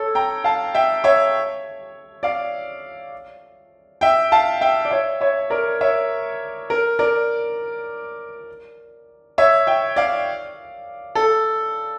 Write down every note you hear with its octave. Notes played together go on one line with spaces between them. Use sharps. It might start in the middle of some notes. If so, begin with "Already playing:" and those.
Already playing: A4 C#5
G5 A#5
F5 A5
E5 G5
C#5 E5
D5 F5
E5 G5
F5 A5
E5 G5
D5
C#5 E5
C#5 E5
A#4 D5
C#5 E5
A#4
A#4 D5
C#5 E5
E5 G5
D5 F5
A4